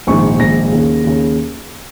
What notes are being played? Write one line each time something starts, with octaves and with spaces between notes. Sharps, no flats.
A#1 G#2 D#3 C#6
A#1 G#2 D#3 A#6
D#2 C#3
D#2 C#3